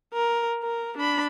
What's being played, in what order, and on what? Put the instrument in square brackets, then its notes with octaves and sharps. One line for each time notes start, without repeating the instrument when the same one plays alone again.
[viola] A#4
A#4
D4 B5